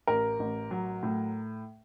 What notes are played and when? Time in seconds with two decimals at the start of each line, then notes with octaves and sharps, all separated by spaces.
0.07 A1 A#4
0.39 A1
0.71 F#3
1.03 A2